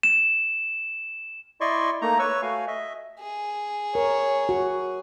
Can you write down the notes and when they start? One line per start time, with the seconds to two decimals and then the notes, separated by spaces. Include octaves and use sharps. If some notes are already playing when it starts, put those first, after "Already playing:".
0.03 E7
1.61 E4 D5 D#5 C6 C#6
2.01 A3 A#3 D#4 A#5
2.19 B4 C#5 C#6 E6
2.42 A3 F#4 F5 G#5
2.67 D#5 E5
3.19 G#4
3.95 A#4 C#5
4.49 F#4